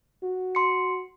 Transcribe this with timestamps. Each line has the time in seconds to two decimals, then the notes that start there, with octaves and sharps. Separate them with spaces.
0.23 F#4
0.55 C6 C#7